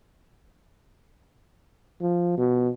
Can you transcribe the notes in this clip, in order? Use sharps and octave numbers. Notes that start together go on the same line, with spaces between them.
F3
B2